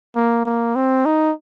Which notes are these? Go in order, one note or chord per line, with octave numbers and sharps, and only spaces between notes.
A#3
A#3
C4
D#4